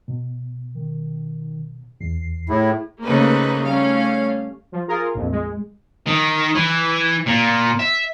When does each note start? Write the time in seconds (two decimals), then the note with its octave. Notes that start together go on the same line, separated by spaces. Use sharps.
0.08 B2
0.75 D#3
2.01 E2 C7
2.49 A2 E4 G#4
3.04 C#3 A3 A#3 C4 D#4 B4
3.63 G3 A3 C#4 F5
4.72 F3
4.88 F4 G#4 A#4
5.14 A#1 F2
5.31 G#3
6.07 D#3
6.55 E3
7.26 A#2
7.79 E5